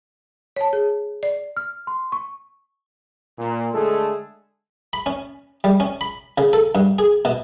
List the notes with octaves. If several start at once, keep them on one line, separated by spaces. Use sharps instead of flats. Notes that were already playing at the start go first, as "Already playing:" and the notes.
C#5 A5
G#4
D5
F6
C6
C#6
A#2
D3 G#3 A3 G#4 A4
B5
C#4
G3
C#4
B5
C#3
A4
G2
G#4
B2